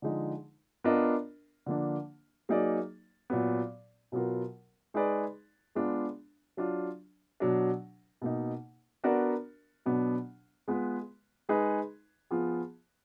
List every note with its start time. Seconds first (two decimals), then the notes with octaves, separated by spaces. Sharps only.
0.02 D3 F3 G#3 D#4
0.84 B3 D4 F4 A#4 D#5
1.66 D3 F3 A#3 D4
2.49 F#3 A#3 D#4 G#4 D5
3.30 A#2 F#3 B3
4.12 B2 F#3 B3 F4 A#4
4.94 G#3 D#4 G#4 B4 D5
5.75 G#3 B3 D4 F4
6.57 F#3 D4 F4
7.40 B2 F#3 D4
8.22 B2 A#3 D#4
9.04 B3 D4 F#4 A#4 D5
9.86 B2 F#3 B3 D4
10.68 G#3 B3 F4 B4
11.49 G#3 D#4 G#4 B4
12.31 F3 B3 F4 G#4